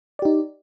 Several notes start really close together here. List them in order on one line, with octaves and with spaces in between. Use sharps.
D5 G4 D#4